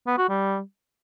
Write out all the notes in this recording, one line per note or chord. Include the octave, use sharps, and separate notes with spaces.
B3
F#4
G3